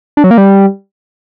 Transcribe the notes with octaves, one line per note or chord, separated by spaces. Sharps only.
D4
F#3
A#3
G3